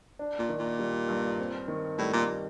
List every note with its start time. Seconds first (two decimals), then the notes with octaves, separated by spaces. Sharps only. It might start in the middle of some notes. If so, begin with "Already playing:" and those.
0.19 D4
0.39 A#2
0.49 D#3
0.59 A#2
0.79 G3
1.08 G2
1.39 C4
1.68 D#3
1.98 A2 G3
2.13 A#2